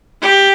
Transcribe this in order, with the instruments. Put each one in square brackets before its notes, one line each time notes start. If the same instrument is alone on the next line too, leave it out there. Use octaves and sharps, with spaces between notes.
[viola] G4